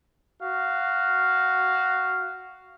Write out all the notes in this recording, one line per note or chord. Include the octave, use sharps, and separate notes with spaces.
F#4 F5